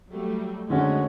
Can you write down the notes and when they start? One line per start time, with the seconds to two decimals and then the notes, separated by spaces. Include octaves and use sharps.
0.11 F#3 G3 A3
0.70 F2 D3 G#3 A3 C#4 F#4